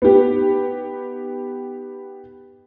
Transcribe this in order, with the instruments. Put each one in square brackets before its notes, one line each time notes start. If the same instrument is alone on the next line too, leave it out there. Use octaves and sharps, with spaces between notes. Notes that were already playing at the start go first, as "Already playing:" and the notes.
[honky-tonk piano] B3 D#4 G4